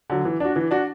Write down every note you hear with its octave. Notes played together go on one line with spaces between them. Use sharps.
D3 F#3
E3
D4 F#4
E3
D4 F#4